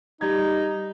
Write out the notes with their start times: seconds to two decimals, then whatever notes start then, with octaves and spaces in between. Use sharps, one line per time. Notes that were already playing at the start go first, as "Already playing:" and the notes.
0.21 G3 D#4 G#6